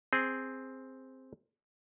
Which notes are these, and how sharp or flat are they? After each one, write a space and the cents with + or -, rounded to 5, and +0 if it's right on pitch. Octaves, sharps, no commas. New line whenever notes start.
C4 +0 G#4 +0